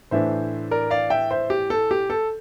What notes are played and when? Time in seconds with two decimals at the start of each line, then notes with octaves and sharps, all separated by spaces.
0.11 A2 E3 A3 D4 C5 E5
0.71 A#4 D5
0.91 D5 F5
1.10 E5 G5
1.31 C5 E5
1.50 G4
1.70 A4
1.91 G4
2.10 A4